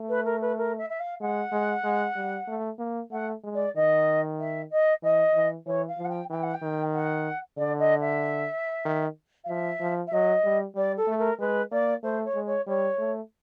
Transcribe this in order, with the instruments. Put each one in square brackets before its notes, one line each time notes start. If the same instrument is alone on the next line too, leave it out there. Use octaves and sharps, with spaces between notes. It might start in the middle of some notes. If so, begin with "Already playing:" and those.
Already playing: [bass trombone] A3
[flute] B4
A#4
B4
A#4
E5
E5
F5
[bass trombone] G#3 [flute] F#5
[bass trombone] G#3
G#3
G3
A3
A#3
[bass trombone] A3 [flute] F#5
[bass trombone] G#3
[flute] D5
[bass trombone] D#3 [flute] D#5
[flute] E5
D#5
[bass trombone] E3 [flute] D#5
[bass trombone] E3
[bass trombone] E3 [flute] C#5
[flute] F5
[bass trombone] F3
[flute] F#5
G5
[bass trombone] E3 [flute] G5
[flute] F#5
G5
[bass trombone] D#3
[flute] F#5
[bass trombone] D3 [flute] D5
[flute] D#5
E5
[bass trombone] D#3
[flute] F5
[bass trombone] F3 [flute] E5
[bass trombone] F3
[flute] E5
[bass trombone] F#3 [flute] D#5
[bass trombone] G3
[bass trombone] G3 [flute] D5
[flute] A4
[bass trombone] A3
[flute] A#4
[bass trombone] G#3 [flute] B4
[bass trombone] A#3 [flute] D5
[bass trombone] A3 [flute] C5
[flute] C#5
[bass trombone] G#3
[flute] C#5
[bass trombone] G3 [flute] C#5
[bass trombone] A3